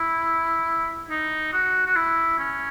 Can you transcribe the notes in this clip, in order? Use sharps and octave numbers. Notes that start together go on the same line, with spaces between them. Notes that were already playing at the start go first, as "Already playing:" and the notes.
Already playing: E4
D#4
F#4
F#4
E4
C#4